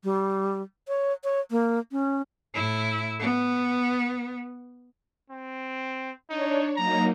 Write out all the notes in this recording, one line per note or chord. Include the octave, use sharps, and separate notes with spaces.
G3
C#5
C#5
A#3
C#4
A2 E4
B3
C4
D4 D#4 C#5
F#3 A#3 D#4 A#5